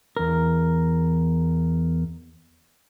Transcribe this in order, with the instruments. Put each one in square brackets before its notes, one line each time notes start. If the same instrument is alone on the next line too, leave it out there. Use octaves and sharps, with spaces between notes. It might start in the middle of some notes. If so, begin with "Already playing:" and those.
[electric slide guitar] E2 A#4